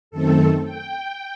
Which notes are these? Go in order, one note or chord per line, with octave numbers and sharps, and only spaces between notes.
F#2 D#3 A3 C4 A4
G5